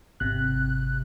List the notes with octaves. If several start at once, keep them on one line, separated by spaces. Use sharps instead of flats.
G#1 C3 F#6